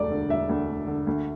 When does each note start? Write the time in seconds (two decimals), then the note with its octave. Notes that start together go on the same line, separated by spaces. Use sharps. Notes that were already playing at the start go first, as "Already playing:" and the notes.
Already playing: E1 D2 A3 D5
0.10 D3
0.29 E1 E5
0.49 D2
0.69 A3
0.87 D3
1.07 D2